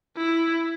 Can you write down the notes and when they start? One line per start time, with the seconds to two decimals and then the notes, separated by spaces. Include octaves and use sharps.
0.17 E4